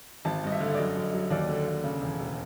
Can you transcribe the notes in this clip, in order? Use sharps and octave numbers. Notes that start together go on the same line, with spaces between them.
G#1 A5
G2 D#5
E5
D3
D5
F#2 D#5
F#2
F#3
D#2 D5
D3
D#2
C#3
E1
E1